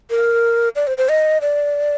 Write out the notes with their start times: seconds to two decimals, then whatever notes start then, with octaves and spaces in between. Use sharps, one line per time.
0.10 A#4
0.76 D5
0.87 C5
0.98 C5
1.09 D#5
1.41 D5